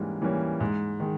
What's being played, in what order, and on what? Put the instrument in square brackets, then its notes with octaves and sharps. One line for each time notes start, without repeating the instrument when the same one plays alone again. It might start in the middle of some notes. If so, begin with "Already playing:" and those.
Already playing: [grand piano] G#2 E3 G3 A#3 C#4
E3 G3 A#3 C#4
G#2
D#3 G#3